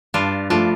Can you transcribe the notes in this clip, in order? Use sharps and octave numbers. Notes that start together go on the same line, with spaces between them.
G2 D4 F4
F3 A3 D4 F4